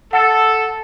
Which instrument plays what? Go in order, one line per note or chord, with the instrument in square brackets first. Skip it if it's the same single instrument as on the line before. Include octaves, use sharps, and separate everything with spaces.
[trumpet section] A4 [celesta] F#5